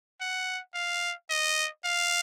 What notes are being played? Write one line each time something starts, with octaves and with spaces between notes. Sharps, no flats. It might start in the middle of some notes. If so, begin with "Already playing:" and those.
F#5
F5
D#5
F5